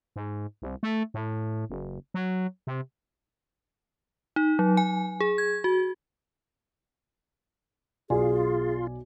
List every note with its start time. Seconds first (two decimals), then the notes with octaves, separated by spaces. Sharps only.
0.16 G#2
0.62 C2
0.83 A3
1.14 A2
1.70 F#1
2.14 F#3
2.67 C3
4.36 D#4
4.59 F#3
4.77 G#5
5.20 G#4
5.38 G#6
5.64 F#4
8.10 B1 F4 G#4 D5 G#5